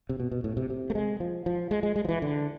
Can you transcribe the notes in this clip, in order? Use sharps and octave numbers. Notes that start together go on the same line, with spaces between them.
C3
B2
B2
A2
C3
C3
A3
G#3
F3
F3
G#3
G#3
G#3
F3
E3
D3